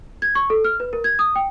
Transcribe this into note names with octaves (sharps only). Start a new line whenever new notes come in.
G#6
C#6
A4
F6
B4
A#4
G#6
D#6
G5